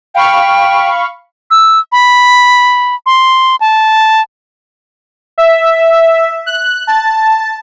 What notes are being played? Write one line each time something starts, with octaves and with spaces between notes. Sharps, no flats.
F5 G5 B5 C#6
E6
B5
C6
A5
E5
F#6
A5